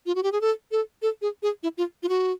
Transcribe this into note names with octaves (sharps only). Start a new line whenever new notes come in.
F4
F#4
G4
G#4
A4
A4
A4
G#4
G#4
E4
F4
F4
F#4